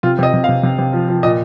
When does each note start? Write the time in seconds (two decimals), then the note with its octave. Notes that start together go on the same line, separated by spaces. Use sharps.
0.03 C3 F4
0.19 C3 D#5
0.33 C3
0.44 C3 F5
0.63 C3
0.78 C3
0.93 F3
1.08 F3
1.23 A#2 D#5